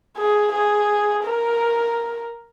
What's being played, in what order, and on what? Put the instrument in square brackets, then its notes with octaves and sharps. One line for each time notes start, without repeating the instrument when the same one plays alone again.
[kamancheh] G#4
G#4
A#4